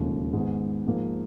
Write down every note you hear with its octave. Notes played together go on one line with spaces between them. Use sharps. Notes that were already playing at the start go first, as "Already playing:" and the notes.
Already playing: E1 D#2 C#3 F3 A3
G#2 D#3 G#3 B3
G#2 F3 A#3